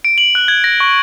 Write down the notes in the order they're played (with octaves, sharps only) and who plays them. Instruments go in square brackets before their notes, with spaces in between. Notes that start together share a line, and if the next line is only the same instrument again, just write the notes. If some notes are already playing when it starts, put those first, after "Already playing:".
[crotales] D7
F#7
F#6
G#6
A#6
C#6